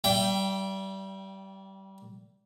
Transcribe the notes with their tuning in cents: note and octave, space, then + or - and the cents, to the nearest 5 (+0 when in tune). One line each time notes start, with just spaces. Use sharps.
G3 -25 E5 +30 G5 +0